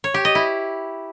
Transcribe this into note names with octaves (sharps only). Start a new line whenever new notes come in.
C#5
G4
D#5
E4